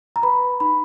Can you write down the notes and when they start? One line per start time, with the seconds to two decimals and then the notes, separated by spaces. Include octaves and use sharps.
0.16 A#5
0.23 B4 B5
0.60 D#4 B5